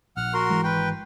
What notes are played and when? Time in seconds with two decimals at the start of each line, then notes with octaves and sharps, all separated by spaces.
0.17 A#1 F#5 F6
0.34 F#4 A#4 C6
0.50 G#1 E3 G#3
0.64 B4 G5